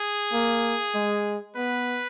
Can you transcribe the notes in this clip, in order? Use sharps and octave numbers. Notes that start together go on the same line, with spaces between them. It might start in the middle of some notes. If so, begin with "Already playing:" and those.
Already playing: G#4
A#3
G#3
B3 B4